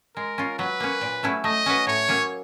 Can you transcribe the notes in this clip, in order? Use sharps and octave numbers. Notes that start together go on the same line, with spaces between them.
G#3 A#4
C#4 F4
F#3 B4
A#3 C#4
A#2
F#3 A3 C#4 E4
A3 D#5
C#4 F#4 B4
A2 C#5
F#3 A#3 C#4